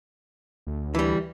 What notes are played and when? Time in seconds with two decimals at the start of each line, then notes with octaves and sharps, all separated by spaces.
0.67 D2
0.95 E3 G3